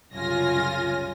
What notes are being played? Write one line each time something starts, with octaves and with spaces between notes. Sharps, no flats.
C2 F#2 C#3 F4 G#5 A#6